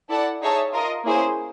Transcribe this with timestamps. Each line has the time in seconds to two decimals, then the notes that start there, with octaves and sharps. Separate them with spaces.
0.09 E4 A4 D5 F#5 A5
0.41 D#4 G#4 C#5 E5 A5
0.73 F4 A#4 D#5
1.04 A#3 C#4 E4 G#4 C5